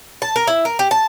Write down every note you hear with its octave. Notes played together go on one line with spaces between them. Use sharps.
A5
A#4
E4
A#4
G4
A5